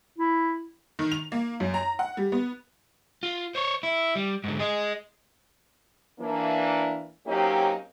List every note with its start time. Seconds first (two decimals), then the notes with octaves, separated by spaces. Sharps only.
0.18 E4
0.99 D#3
1.12 F7
1.32 A#3
1.60 F#2
1.74 A#5
1.99 F#5
2.17 G3
2.32 B3
3.23 F4
3.55 C5 C#5
3.83 E4
4.15 G3
4.44 G#2 D3
4.59 G#4 D#5
6.20 E3 A#3 D4
7.27 F#3 A#3 C4 C#4 D#4 G4